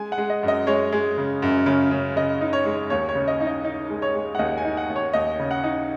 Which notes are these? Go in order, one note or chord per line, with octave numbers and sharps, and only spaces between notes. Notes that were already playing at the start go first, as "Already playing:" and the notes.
Already playing: G#3 G#5
F#5
G#3
D#5
F#2
D#5
G#3 C#5
G#3
C#3
F#2
C#3
C#3
C#3 D#5
D#4
C#5
G#3
D#2 C#5
C#5
C#3
D#5
D#4
D#5
D#4
G#3
C#5
G#3
F#5
D#2 D#5
G#5
D#4
F#5
D#2
C#5
D#2 D#5
C#3
F#5
D#4